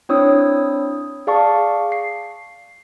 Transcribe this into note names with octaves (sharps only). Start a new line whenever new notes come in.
C4 D4 E4 C#5 D#6 E6
G#4 D5 F5 A5 C#6
C7